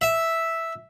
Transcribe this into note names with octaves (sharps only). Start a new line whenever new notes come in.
E5